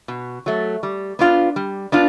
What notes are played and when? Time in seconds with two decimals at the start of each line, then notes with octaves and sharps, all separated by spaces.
0.08 B2
0.46 F#3 A3
0.83 G3
1.19 B3 D4 F4
1.56 G3
1.92 B3 D4 F4